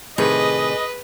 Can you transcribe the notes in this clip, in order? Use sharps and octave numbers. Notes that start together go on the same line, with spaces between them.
A2 C3 D#3 G#4 B4 D#5